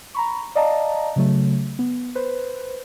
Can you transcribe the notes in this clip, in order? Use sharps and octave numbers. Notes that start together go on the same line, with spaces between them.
A#5 B5 C#6
D5 D#5 F5 A5 A#5
C#3 F#3 A3
B3
B4 C5